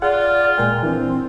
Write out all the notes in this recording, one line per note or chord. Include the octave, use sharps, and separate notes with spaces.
F4 G#4 D5 F#5
A#2 G#3 A#4 G5
E3 C4 D4